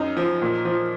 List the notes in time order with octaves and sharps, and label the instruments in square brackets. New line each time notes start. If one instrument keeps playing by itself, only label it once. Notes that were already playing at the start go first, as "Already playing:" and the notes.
Already playing: [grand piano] F#2 D#4
F3
A#2
F3